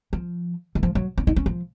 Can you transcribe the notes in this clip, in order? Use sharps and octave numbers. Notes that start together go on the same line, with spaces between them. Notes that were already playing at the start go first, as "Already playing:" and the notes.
F3
D#3
F3
F#3
C#4
D#4
C#4
F3